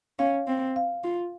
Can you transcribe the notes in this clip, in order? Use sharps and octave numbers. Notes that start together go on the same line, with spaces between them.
C#4 F5
C4
F5
F4